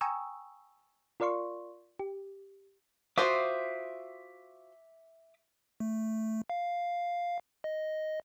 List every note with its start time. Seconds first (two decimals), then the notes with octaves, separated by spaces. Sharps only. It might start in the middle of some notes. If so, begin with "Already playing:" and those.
0.01 G5 G#5 A#5 C#6 D#6 E6
1.20 F4 A#4 D5 F5 C6 C#6
1.99 G4
3.18 F4 F#4 C5 E5 D6 D#6
5.80 A3
6.50 F5
7.64 D#5